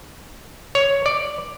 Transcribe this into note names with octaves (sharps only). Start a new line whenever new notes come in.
C#5
D5